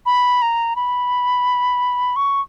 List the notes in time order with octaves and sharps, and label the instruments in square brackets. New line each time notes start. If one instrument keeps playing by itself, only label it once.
[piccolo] B5
A#5
B5
C#6